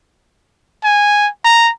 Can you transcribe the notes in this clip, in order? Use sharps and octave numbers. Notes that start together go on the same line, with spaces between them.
G#5
A#5